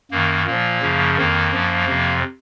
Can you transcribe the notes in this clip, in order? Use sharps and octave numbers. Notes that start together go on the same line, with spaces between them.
F#2 D#3 A#3
A#2 F3 A#3
F#2 C#3 F3
F2 D#3 A#3
F#2 F3
F2 C3 F3